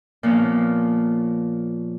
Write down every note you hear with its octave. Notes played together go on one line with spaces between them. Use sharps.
A#2 F3 B3 C#4